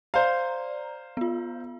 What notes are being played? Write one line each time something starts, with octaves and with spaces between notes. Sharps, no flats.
C5 D5 F5 A#5
B3 F4